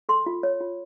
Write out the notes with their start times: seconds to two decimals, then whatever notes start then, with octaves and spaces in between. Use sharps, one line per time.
0.09 A4 C6
0.26 F4
0.43 C#5
0.61 F4